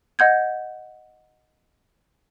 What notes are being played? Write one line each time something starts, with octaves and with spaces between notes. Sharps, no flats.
D#5 F#5 G6 G#6